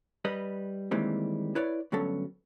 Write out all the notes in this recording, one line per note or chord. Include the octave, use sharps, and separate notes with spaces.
G3 B4 D#5
D#3 E3 G3 G#3 A#3 C4
E4 B4 C#5 D5
D2 G2 F#3 B3 C#4 A4